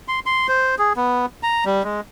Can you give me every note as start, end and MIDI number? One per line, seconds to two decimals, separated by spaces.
0.08 0.20 84
0.26 0.47 84
0.48 0.75 72
0.79 0.93 68
0.96 1.26 59
1.43 1.64 82
1.65 1.83 55
1.83 2.01 56